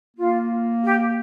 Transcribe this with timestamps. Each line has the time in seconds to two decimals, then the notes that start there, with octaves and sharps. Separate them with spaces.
0.17 A#3 F4
0.83 G4